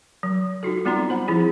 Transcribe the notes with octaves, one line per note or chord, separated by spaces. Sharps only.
F#3
D#4 F4 F#4 A4
G3 B3 C4 F4 A#5 C6
C5 F#5 B5
F3 C4 E4 G#4